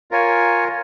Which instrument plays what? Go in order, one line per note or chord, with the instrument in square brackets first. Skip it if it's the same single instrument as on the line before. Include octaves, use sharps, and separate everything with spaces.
[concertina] F4 A#4 C#5 G#5